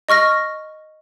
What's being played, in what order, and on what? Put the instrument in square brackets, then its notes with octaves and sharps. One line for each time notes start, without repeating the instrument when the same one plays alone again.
[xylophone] D#5 C#6 F6 A#6